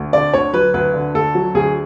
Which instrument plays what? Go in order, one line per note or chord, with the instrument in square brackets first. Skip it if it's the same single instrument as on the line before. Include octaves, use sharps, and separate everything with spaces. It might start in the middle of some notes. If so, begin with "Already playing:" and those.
Already playing: [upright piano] D2
D3 D5
D2 C#5
F#3 B4
D2 B4
D3
D2 A4
F#3
D2 G#4